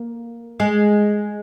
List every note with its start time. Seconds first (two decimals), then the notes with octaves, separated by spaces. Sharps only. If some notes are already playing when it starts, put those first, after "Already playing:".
Already playing: A#3
0.60 G#3